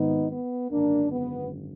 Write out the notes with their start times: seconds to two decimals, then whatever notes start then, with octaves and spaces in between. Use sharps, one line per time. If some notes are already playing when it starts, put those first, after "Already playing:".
Already playing: G#1 G#2 D#3 B3 D#4
0.30 B3
0.70 G#1 F#2 D3 A#3 D4
1.11 B3